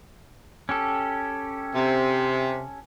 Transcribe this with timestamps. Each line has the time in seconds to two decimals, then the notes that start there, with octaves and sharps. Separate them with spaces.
0.69 C#4 G4 A4
1.75 C3